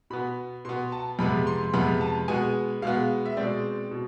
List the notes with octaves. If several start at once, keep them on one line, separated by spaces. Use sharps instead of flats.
B2 B3 B5
B2 B3 C6
A5
F2 C3 G#3 B3 B5
C6
F2 C3 G#3 B3 B5
A5
B2 G#3 B3 G#5
B2 G#3 B3 F5
E5
B2 G#3 C4 D5
B2